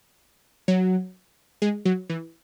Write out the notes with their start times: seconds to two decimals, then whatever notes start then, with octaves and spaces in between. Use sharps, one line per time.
0.68 F#3
1.62 G#3
1.85 F#3
2.10 E3